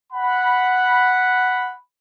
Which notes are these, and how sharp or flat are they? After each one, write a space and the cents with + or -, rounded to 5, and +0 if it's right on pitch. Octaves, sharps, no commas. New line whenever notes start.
F#5 +0 B5 +0